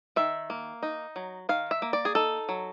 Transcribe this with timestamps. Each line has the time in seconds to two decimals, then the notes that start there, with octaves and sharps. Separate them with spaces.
0.16 D#3 E5
0.50 A#3
0.83 D#4
1.16 F#3
1.49 D#3 F5
1.71 E5
1.82 A#3
1.93 D5
2.05 G#4
2.15 D#4 A4
2.49 F#3